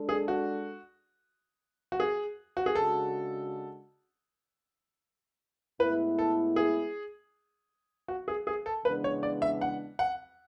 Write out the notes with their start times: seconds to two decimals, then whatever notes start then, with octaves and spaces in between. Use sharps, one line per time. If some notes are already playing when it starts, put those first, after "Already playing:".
Already playing: G#3 D4 A4
0.09 G#4
0.28 F#4
1.92 F#4
2.00 G#4
2.57 F#4
2.66 G#4
2.75 C#3 G#3 D4 F#4 A4
5.80 A2 G#3 B3 E4 B4
6.19 A4
6.56 G#4
8.08 F#4
8.28 G#4
8.47 G#4
8.66 A4
8.85 C#3 E3 G#3 B3 D4 B4
9.04 C#5
9.23 D5
9.42 E5
9.61 F#5
9.99 F#5